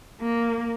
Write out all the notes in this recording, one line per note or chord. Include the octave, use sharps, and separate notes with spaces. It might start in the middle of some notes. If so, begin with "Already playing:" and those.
A#3